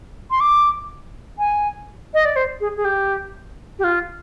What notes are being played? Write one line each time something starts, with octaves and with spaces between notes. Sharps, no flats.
C6
D6
G#5
D#5
D5
C5
G#4
G#4
G4
G4
F4